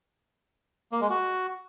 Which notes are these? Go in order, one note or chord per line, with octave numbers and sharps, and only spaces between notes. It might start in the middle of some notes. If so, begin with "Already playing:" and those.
A#3
G#3
F#4